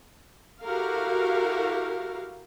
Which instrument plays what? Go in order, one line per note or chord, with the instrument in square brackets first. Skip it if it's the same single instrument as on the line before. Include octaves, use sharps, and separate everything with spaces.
[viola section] E4 F#4 G4 A4 A#4 F5